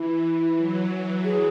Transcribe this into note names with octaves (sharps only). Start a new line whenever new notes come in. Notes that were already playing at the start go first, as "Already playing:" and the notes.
Already playing: E3 E4
F#3
E3
G#4